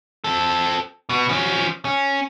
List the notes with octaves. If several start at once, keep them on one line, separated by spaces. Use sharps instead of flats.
C4 A4
B2 B3
F3 C#4
C#4